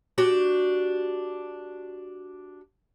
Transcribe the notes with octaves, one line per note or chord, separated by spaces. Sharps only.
D4 F#4 G4